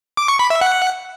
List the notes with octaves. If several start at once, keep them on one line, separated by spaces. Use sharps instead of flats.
D6
C#6
B5
E5
F#5